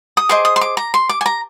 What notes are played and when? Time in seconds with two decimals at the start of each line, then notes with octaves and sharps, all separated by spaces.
0.17 D#6
0.29 G#4 C5 D#5 D6
0.45 D#6
0.56 C6
0.61 D6
0.77 A#5
0.94 C6
1.09 D6
1.21 G#5
1.26 A#5